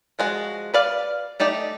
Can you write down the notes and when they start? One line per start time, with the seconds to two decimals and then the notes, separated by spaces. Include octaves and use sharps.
0.19 F3 G#3 F#4
0.74 B4 D5 F5
1.40 A3 D#4 G4 D5